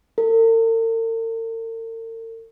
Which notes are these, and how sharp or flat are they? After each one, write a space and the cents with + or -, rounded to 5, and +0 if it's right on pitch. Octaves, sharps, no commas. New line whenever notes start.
A#4 -45